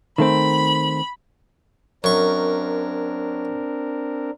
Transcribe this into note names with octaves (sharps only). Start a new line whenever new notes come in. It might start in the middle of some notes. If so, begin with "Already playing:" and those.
D#3 A3 C4 B5
F#2 C4 D4 A#4 C#6